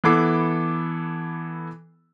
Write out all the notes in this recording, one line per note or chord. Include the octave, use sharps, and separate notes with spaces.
E3 B3 E4 A4 D6 C7